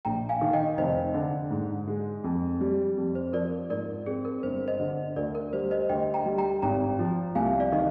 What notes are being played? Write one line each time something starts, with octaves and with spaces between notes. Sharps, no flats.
A#1 G5 A#5
F5 G#5
D#3
D#5 G5
F1 C5 D#5
D3
G#2
G#3
F2
G3
F2
C5
F3 A#4 D5
G#2 A#4 D5
C4 G#4
A#4
G1 C5
C5 D#5
D3
D2 A#4 D5
A#4
G3 C5
C5 D#5
D2 D#5 G5
G5 A#5
G3
G5 A#5
G#1 G5 A#5
F3
C2 F5 G#5
D5 F5
D#3 D#5